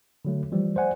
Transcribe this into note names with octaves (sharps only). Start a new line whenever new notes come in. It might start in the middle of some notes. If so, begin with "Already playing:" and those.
D3 F#3 A3
E3 F3 G3
C5 D5 F#5 G#5